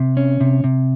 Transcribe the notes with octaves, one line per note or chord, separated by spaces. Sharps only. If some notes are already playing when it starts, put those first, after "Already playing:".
Already playing: C3
C#4
C3
C3